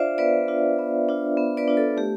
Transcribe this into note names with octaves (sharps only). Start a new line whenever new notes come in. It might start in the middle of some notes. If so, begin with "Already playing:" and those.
Already playing: D4 F4 C5 D5 E5 F5
B3 B4 D5
D4 F4
B3
D4 F4
B3
B4 D5
D4 F4
A4
A3 G4